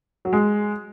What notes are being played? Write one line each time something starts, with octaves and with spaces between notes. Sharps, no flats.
F#3
G#3